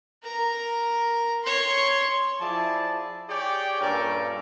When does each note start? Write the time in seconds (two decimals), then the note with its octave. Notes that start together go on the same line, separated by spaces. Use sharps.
0.23 A#4 A#5
1.44 C#5 C6
2.40 F3 E4 G#4 D5 A5
3.29 G4 G#4 C#5 D5 G5
3.81 G2 A#2 C#4 A4 A#4 D5